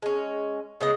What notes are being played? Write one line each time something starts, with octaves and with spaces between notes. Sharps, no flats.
G#3 C#4
C#3 B3 D#5